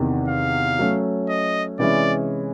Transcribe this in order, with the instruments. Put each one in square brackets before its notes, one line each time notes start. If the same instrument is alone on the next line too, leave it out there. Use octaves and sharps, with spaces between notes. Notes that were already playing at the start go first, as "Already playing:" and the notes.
Already playing: [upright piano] E2 C3 D#3
[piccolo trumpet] F5
[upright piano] F#3 A3 C#4
[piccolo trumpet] D#5
[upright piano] C3 E3 G#3 C#4 E4 [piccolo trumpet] D5